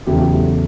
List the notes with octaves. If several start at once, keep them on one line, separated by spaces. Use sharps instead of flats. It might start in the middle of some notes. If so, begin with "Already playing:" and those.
E2 C#3 F#3 A3 E4 G4